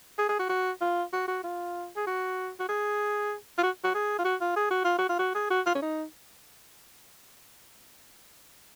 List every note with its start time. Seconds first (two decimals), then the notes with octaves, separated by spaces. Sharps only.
0.18 G#4
0.29 G#4
0.39 F#4
0.49 F#4
0.81 F4
1.13 F#4
1.28 F#4
1.44 F4
1.96 G#4
2.07 F#4
2.59 F#4
2.69 G#4
3.58 F4
3.63 F#4
3.84 F#4
3.94 G#4
4.19 F4
4.25 F#4
4.41 F4
4.56 G#4
4.71 F#4
4.84 F4
4.98 F#4
5.09 F4
5.19 F#4
5.35 G#4
5.50 F#4
5.66 F4
5.75 C#4
5.82 D#4